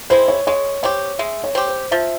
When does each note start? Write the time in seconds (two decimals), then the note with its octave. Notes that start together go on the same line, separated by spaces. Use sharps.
0.10 G#3 C4 E4 C5
0.28 C#5
0.47 G#3 C#5
0.83 C4 G4 C#5
1.19 G#3 E5
1.44 C#5
1.55 C4 G4
1.68 C5
1.91 F3 E5